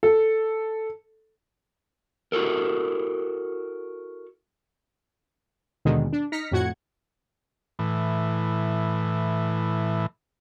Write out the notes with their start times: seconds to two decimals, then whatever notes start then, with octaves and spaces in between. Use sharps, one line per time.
0.03 A4
2.32 E4 F#4 A4 A#4
5.85 D#2 B2 D3 D#3 G#3
6.13 D4
6.32 D#4 F6 A#6 B6 C#7
6.51 F2 A2 F#4 F#5 G#6 C#7
7.79 A2 E3